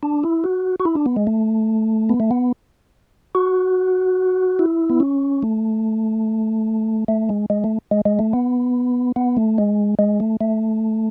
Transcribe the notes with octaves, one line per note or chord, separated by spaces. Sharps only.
D4
E4
F#4
F#4
E4
D4
B3
G#3
A3
B3
A3
B3
F#4
E4
B3
C#4
A3
A3
G#3
G#3
A3
G#3
G#3
A3
B3
B3
A3
G#3
G#3
A3
A3